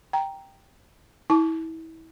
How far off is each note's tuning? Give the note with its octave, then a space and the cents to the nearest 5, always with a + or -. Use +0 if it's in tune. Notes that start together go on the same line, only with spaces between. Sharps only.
G5 +0 A#5 +0
E4 -30 A5 -25 D6 -15